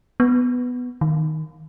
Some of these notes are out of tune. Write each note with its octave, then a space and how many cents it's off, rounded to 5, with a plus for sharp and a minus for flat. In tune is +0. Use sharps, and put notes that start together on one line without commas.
B3 +5
D#3 +0